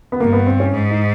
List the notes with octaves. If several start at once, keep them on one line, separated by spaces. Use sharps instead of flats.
B3
G2 A#3
B3
C4
C#4
G#2
D#4